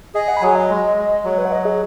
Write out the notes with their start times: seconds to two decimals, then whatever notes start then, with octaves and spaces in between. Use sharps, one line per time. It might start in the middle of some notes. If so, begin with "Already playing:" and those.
0.15 G#4 D#5
0.28 F#5
0.37 B5
0.42 F#3 G#5
0.55 D#5
0.70 G#3
0.97 G#3
1.24 F#3 C#5
1.38 B4
1.45 F#5
1.52 D#5
1.65 G#4